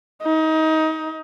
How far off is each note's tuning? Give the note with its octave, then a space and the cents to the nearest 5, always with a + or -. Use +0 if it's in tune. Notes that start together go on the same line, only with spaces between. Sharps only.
D#4 +25